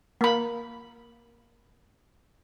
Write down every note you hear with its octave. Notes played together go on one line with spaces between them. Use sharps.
A#3 B5